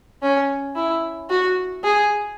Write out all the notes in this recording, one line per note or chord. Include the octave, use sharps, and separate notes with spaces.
C#4
E4
F#4
G#4